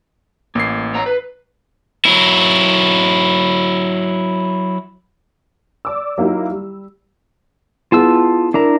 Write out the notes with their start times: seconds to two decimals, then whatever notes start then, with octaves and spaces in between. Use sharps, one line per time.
0.55 A1 A#3 C7
0.94 C#5 A#5
1.06 B4
2.05 F#3 E4
5.85 D5 D6 E6
6.18 F#3 A#3 D#4 E4 G4
6.51 G3
7.92 B3 E4 F4 G#4 A5 E6
8.54 D4 E4 A#4 A#5